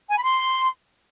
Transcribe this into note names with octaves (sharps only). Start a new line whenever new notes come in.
G#5
B5
C6